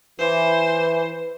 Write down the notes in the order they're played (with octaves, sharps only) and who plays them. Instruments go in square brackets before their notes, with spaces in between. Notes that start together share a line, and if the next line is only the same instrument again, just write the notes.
[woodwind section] E3 [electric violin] C5